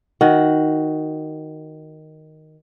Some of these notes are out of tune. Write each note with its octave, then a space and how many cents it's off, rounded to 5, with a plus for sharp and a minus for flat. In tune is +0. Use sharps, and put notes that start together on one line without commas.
D#3 +0 F#4 +0